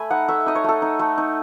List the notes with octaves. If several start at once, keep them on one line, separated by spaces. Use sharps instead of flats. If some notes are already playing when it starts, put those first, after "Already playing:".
Already playing: A3 G#5 B5
D#4 F#5
A3 E5
D#4 D#5
C#5
A3 A4
D#4
A3
D#4